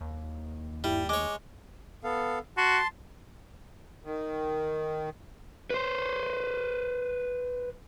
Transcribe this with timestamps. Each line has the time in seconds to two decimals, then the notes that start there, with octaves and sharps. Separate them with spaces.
0.01 D#2
0.84 G2 G3 E4
1.09 G#3 C#5 D6
2.04 B3 A4 F5
2.57 F#4 A5 C6
4.04 D#3
5.70 B4 C5